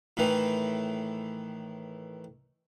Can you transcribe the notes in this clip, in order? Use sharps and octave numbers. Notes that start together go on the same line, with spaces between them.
A2 D#3 E3